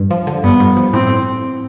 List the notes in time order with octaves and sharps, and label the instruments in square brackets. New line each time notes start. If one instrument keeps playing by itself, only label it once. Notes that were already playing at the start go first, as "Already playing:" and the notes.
Already playing: [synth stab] G2
F3
D3
[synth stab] G2 [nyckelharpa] B3
[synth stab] G2
F3
[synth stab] A2 [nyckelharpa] C4